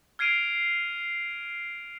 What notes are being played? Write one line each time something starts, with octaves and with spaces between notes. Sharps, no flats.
F6 G#6 C7 D7 D#7 F7